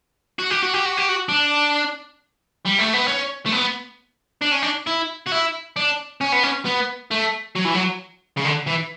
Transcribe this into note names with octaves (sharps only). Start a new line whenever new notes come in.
F#4
G4
F#4
G4
F#4
G4
F#4
D4
G3
A3
B3
C#4
A3
B3
D4
C#4
D4
E4
F#4
E4
D4
C#4
B3
C#4
B3
A3
F#3
E3
F#3
C#3
D3
E3